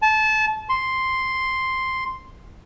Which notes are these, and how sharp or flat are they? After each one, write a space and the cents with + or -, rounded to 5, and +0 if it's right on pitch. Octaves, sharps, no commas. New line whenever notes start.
A5 -25
C6 +0